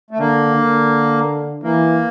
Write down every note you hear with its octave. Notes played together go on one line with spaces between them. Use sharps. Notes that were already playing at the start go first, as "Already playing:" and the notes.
A3
D3 A#3
D3
E3 A#3